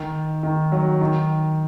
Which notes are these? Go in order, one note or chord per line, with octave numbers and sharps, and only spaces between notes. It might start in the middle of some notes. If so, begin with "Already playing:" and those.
Already playing: D#3
D#3
F#3
D#3